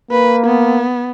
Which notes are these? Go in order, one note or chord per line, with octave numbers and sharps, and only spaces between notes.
A#3 B4
B3